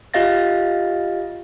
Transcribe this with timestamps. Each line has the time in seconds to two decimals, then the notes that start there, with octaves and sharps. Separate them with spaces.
0.14 F4 G4 D#5 F5 A6 A#6